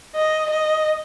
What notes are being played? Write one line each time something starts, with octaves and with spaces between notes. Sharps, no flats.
D#5
D#5